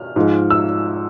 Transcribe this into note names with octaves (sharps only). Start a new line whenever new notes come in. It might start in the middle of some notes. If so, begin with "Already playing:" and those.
Already playing: F6
G#2 F3 G#3
E6